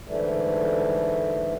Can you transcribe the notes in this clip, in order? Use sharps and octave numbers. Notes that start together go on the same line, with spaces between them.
G#2 D3 E3 G3 A3